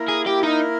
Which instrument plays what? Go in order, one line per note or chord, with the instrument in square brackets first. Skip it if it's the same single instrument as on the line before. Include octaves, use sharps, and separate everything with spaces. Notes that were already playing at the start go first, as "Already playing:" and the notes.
Already playing: [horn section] A#3 E4 A#4
[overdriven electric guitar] G#4
G4
D#4